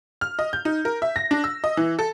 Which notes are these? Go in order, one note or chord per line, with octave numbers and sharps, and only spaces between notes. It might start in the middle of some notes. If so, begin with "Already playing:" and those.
F6
D#5
G6
D#4
A#4
E5
A#6
D4
E6
D#5
E3
A4